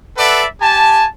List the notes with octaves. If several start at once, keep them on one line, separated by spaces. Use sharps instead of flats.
A4 B4 D5 E5 F#5
G4 G#5 A5